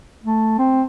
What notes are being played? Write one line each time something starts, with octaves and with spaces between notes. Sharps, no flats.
A3
C4